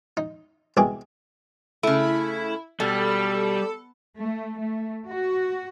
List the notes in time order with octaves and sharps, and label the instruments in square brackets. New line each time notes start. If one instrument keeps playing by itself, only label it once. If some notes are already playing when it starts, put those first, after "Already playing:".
[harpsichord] D#4
C2 B2 G#4 D6
[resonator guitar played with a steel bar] C#3 A3 [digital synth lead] E4
[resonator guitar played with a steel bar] B2 [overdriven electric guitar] G3 [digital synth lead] A4
[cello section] A3
A3
F#4